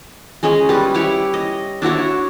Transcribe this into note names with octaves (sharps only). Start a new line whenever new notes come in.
G#3 C#4 G#4 D#5
G3 B4
E4 G4 C#5
D#5
D4 E4 F#4 C#5